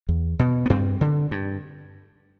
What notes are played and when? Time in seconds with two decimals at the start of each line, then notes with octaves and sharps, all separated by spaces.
0.09 E2
0.39 B2
0.66 B3
0.70 G2 C4
1.01 D3
1.31 G2